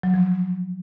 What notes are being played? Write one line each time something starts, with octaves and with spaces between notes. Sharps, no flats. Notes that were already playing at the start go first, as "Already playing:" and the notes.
F#3
F3